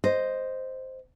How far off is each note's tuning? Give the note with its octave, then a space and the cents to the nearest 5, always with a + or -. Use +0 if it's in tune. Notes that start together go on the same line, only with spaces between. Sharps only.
C5 +0 D#5 +0